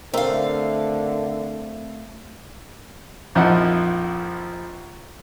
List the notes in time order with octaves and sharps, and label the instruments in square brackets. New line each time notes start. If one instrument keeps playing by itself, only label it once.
[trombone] D3 [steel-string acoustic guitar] A3 F5 [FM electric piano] C4 A#4 E5
[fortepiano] A#1 F2 F3 D#4 E4 F#5